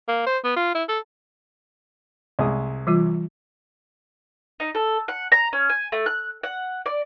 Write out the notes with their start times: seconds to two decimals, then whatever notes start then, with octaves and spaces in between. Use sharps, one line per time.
0.08 A#3
0.27 C5
0.44 B3
0.56 F4
0.75 E4
0.89 A4
2.39 C2 G#3 D#6
2.87 E3 G3 F4
4.60 D#4
4.75 A4
5.08 F#5
5.32 A#5
5.53 C#4
5.70 G#5
5.92 A3
6.06 F#6
6.43 F#5
6.86 D5